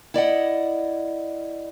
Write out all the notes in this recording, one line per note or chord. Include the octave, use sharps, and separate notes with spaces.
E4 D5 D#5 F#5